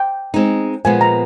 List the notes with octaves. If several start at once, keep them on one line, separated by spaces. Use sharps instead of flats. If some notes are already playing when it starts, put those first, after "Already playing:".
Already playing: G5
G#3 C4 D#4
A#2 F3 G#3 B3 G#5
A#5